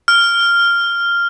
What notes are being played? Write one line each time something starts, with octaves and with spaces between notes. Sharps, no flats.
F6